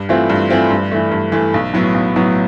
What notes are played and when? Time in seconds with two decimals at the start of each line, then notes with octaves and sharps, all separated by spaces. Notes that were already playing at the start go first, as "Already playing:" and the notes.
Already playing: G2
0.09 E3 A3 C4 F4
0.30 G2
0.50 E3 A3 C4 F4
0.70 G2
0.92 E3 A3
1.11 G2
1.32 E3 A3
1.54 B1
1.74 A2 F#3 B3
1.94 B1
2.16 A2 F#3 B3